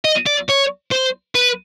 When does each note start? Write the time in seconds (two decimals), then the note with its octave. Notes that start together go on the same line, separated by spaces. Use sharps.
0.05 D#5
0.26 D5
0.49 C#5
0.91 C5
1.35 B4